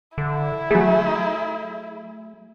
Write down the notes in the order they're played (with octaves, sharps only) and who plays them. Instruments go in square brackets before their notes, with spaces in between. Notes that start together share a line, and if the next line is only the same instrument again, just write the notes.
[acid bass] D3 [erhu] E4
[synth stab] F#3 G#4 [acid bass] A3